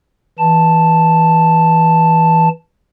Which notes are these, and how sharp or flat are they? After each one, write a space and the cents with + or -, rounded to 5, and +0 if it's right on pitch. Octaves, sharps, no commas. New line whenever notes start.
E3 -15 A5 +0